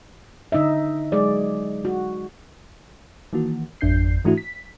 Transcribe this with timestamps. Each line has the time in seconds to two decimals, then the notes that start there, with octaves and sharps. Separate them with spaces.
0.52 D3 D#4 D#5 E5
1.12 F#3 G#3 G#4 D5
1.85 F#4
3.33 D#3 E3 A#3 F#4
3.81 G#1 F2 D4 G6 C7
4.24 G#2 E3 A3 D4 E4 F#4
4.38 B6